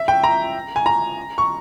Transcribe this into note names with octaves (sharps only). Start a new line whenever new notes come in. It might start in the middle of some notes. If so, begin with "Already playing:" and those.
Already playing: E5
G5
A#5
G#5
A#5
C#6